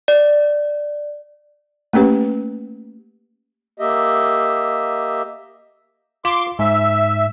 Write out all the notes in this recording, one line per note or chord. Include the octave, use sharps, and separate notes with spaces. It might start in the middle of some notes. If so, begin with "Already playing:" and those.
D5
A3 A#3 C#4 G4 B4
A#3 G4 D#5 E5
F4 C6 D6
G#2 E5